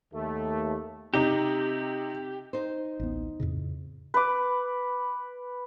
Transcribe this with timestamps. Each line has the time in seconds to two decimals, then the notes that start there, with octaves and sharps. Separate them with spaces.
0.13 D#2 A3
1.14 C3 D#4 G4
2.53 D#4 C5
3.00 A1 D2 B3
3.40 F2 A2 C#3
4.14 B4 D6